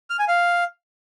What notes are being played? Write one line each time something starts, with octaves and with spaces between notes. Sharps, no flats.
F6
G#5
F5